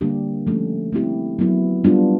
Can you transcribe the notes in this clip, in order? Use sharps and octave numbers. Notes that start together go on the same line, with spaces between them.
D3 G3 A#3 D4 G4
F3 A3 C#4
A3 C4 E4 G4
F#3 B3 E4
G3 B3 D4 F4